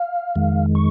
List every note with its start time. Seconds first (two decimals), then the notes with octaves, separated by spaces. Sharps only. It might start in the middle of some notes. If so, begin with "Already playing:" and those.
Already playing: F5
0.36 F2 D#3 G#3
0.75 C#6